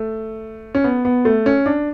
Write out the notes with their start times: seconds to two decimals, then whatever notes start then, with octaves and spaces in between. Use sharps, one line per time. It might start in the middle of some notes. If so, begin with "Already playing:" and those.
Already playing: A3
0.75 C#4
0.84 B3
1.05 B3
1.25 A3
1.46 C#4
1.66 D4